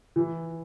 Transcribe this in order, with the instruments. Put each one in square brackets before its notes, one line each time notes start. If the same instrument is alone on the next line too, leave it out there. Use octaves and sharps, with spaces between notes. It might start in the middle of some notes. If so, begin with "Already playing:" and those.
[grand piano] E3